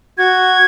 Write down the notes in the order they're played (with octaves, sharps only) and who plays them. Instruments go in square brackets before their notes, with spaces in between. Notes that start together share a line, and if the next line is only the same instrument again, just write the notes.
[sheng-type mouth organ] F#4 [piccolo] G#6